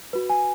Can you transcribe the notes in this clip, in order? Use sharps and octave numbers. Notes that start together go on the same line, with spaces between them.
F#4 B4
G#5